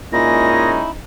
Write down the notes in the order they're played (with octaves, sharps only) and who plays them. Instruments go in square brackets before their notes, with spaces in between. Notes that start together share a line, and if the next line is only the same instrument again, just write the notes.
[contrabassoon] A#2 [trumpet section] G#3 C#4 D#4 [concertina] E4 [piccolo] A#6